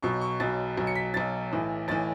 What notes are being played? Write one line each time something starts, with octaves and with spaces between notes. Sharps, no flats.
B1 B2 F#3 C#6
C#6
B1 B2 F#3 A6
B1 B2 F#3
C#7
B6
B1 B2 F#3 A6
B1 A2 E3
B1 A2 E3 A6